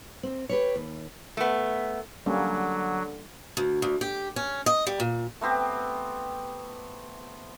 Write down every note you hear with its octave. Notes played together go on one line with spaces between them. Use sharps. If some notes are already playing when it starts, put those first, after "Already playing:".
C4
G4 B4 C#5
D#2
A3 B3
D3 F#3 G3 A#3 C#4
D2
D2
G4
C#4
D#5
G3
A#2
A3 B3 C4 G4